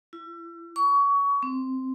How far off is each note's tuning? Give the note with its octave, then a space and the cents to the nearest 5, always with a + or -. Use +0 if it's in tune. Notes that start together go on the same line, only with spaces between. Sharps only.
E4 +35
C#6 +25
C4 -5